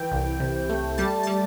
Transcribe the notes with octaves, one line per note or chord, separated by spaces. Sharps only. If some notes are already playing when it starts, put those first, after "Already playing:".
Already playing: E3 G5
C2
C3
A3
G3 A5
G3 A5